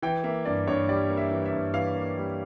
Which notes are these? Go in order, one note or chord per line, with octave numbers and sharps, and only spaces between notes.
E3 G5
A#3 E5
G2 D5
G2 C#5
G3 D5
A#3
E5
E3
E5
G2
E3 F5
A#3
G3